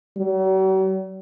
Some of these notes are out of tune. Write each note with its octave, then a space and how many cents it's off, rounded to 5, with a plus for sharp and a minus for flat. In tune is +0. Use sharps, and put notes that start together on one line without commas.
F#3 +45